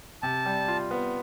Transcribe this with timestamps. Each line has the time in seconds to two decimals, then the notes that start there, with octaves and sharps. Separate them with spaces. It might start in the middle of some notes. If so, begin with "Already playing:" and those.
0.23 C3 A5
0.46 G3
0.68 F4
0.91 B3